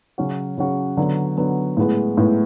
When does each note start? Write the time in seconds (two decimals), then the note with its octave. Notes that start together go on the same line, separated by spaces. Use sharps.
0.18 C#3 F#3 C#4 F#4
0.57 C#3 F#3 C#4 F#4
0.97 D3 F#3 B3
1.37 D3 F#3 B3
1.77 A2 G#3 B3
2.17 A2 G#3 B3